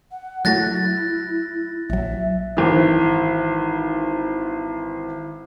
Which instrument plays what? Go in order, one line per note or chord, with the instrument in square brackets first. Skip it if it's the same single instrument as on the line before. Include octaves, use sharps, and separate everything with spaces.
[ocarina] F#5
[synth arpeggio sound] F#3 A3 F#4 [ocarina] E4 [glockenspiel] F#6 A6 A#6
[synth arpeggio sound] A#1 F#3 [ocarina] E5
[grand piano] G#1 E3